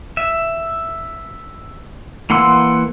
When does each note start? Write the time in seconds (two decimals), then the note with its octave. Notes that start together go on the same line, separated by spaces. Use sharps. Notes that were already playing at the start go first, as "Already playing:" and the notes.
0.17 E5
2.30 E3 A#3 F#5 C6 E6